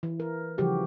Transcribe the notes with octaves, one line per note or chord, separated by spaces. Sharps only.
E3
A#4
C#3 E3 F3 G3 F#4 G4